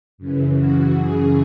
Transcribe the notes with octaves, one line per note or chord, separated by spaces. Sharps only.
F#2 C#3 E3
F#4
F#2 C#3 E3 G#4